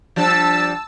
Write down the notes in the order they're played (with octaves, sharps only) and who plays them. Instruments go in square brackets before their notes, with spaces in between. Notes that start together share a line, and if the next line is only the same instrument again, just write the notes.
[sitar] F3 G3 D4 [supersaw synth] A5 E6